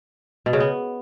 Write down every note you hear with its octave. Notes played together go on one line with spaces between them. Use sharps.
B2
C#3
B3